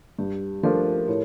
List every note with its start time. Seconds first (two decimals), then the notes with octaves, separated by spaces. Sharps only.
0.19 G2 G4
0.63 F3 A3 D4 F4 A#4
1.08 A2 C#5